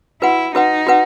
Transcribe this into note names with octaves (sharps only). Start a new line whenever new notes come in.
E4 F#4 B4 F#5
D#4 F#4 B4 F#5
F#4 B4 F#5